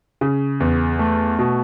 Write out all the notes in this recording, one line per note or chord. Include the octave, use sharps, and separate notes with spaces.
C#3
E2
A3
B2